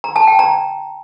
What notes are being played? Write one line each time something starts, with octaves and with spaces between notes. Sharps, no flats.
A#5
A5
G5
A#5